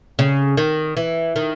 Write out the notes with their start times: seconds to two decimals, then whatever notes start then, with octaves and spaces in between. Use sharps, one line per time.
0.19 C#3
0.57 D#3
0.97 E3
1.36 D#3